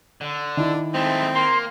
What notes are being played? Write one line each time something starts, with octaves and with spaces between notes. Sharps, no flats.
D3
D#3 D4 E4
G#3 A3 C4
A#3 C6